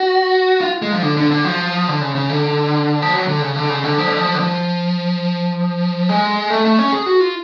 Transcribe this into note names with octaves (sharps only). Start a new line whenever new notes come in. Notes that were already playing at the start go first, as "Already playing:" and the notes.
Already playing: F#4
F4
G#3
F3
D3
D3
D3
F3
D3
C#3
C#3
D3
F3
F#3
D3
C#3
D3
C#3
D3
F3
D3
F3
D3
F3
G#3
A3
A3
C#4
G#4
F#4
F4